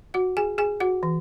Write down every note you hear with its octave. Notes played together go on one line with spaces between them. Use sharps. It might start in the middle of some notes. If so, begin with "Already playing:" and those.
F#4 F#5
G#4 G#5
G#4 G#5
F#4 F#5
E3